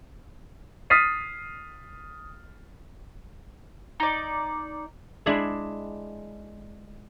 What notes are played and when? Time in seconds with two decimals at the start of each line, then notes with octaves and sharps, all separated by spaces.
0.90 D#6 F6 A6 B6 C7 D#7
4.00 D#4 D5
5.26 G#3 D4 E4 G#4 E5